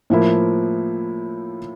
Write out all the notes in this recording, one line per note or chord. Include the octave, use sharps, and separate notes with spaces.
A2 F3 A#3 E4